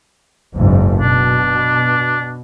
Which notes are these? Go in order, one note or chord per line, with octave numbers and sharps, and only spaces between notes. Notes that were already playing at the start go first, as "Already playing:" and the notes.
F#1 B1 G#2
B2 D4